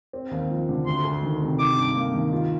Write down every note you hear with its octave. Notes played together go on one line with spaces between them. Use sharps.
C4
D#2
F3
D3
D2 C6
D2
D#3
C3
D#4 D6
G2
A#3
D#3
F4